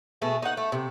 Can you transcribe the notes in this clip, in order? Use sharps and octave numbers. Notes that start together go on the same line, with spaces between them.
B2 A3 G#4
D#4 F#5
A3
C3